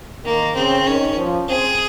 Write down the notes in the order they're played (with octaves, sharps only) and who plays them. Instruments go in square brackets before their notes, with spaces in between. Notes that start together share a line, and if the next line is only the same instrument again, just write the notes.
[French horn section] D#3 [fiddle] A#3
[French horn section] C#3 [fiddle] C4
[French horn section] D#3 [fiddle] C#4
[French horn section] F3
[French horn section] C4 [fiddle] G#4